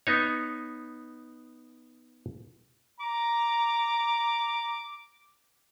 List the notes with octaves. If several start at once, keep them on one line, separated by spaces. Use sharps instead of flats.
B3 D#4 C#5
A#5 D6